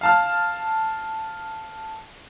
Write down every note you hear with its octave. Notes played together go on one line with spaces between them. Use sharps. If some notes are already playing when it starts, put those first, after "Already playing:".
F5 A5 F6